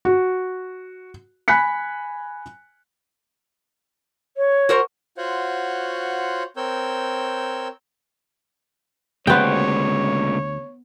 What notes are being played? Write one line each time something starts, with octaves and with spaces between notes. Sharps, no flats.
F#4
G#5 B5 F#6 B6 C#7
C#5
F#4 A#4 C5
F4 F#4 C5 C#5 F#5
C4 A#4 C#5 E6 G6
D2 C#3 G#3 A#3 B3 C5 C#5 G5